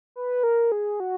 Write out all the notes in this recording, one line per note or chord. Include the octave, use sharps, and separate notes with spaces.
B4
A#4
G#4
F#4